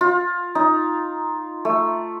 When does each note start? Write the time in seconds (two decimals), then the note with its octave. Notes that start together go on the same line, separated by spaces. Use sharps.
0.01 F4
0.55 D#4
1.65 A3